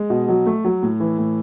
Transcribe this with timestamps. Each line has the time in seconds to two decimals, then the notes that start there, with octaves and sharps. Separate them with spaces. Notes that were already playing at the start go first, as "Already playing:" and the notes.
Already playing: G#3
0.10 B2
0.28 F#3
0.46 A3
0.65 F#3
0.83 A2
1.00 E3
1.18 A2